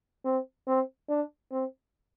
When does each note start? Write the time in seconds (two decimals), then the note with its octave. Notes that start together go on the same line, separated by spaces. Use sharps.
0.25 C4
0.67 C4
1.09 D4
1.51 C4